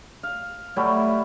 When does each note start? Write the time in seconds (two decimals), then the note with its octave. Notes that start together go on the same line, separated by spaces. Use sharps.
0.23 F5
0.76 F#3 G3 A3 E4